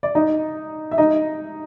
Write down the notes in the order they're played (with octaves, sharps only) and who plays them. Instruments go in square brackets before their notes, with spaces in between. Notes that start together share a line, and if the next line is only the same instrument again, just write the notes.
[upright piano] D5
D#4 D#5
E5
D#4 D#5